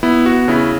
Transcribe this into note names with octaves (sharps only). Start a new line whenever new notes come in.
B3 E4
F#4
C#3 E4